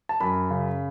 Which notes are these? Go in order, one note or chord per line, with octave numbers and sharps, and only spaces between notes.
A5
F#2 B5
C#3